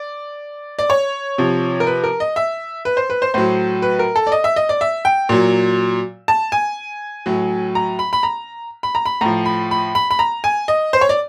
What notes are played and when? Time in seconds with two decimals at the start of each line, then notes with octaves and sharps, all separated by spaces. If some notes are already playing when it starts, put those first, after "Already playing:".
Already playing: D5
0.79 D5
0.90 C#5
1.38 C3 F3
1.80 A#4
1.87 B4
2.04 A#4
2.20 D#5
2.36 E5
2.85 B4
2.97 C5
3.10 B4
3.22 C5
3.34 A2 F#3 C5
3.82 B4
3.99 A#4
4.16 A4
4.27 D5
4.32 D#5
4.44 E5
4.56 D#5
4.69 D5
4.81 E5
5.05 G5
5.29 A#2 F#3
6.28 A5
6.52 G#5
7.26 A2 F#3
7.75 A#5
7.99 B5
8.13 B5
8.23 A#5
8.83 B5
8.95 A#5
9.06 B5
9.21 A2 F3 A#5
9.46 B5
9.71 B5
9.95 B5
10.11 B5
10.19 A#5
10.44 G#5
10.68 D#5
10.93 C5
11.01 C#5
11.09 D5